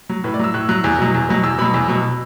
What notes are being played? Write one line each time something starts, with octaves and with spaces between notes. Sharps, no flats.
F#3
A2 B4
D5
F#3 E6
A2 F#6
F#3 F#6
E2
B2 F#3
E2
B2 F#3
E2 E6
B2 F#3 B5
E2
B2 F#3